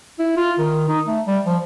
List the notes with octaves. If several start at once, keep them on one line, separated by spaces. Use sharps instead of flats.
E4
F4
D#3
D#4
A3
G3
F3